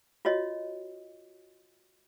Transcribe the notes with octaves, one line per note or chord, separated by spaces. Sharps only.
F4 F#4 C#5 D#5